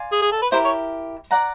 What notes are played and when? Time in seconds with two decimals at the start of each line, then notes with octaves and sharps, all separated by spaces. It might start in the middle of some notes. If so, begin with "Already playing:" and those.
Already playing: D5 F5 G#5 C6
0.12 G#4
0.22 G#4
0.32 A4
0.42 B4
0.52 E4 G4 A#4 C5
0.65 C#5
1.31 D5 F#5 A#5